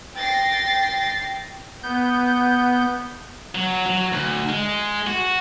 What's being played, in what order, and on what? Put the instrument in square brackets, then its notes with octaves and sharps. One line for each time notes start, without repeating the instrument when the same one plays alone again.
[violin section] G5 A6 A#6 C7
[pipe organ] B3 G6
[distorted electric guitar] F#3
F#3
D2
G#3
F#4